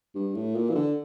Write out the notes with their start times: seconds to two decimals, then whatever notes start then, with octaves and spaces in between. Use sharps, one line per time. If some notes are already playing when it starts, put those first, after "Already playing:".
0.15 G2
0.35 A2
0.55 A#2
0.70 E3
0.75 D3